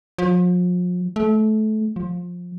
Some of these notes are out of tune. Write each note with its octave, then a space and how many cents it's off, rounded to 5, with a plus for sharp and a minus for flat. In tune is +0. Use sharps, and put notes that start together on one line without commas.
F3 +40
A3 -25
F3 +20